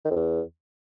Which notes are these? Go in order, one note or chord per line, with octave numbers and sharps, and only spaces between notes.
D#3
F2
E2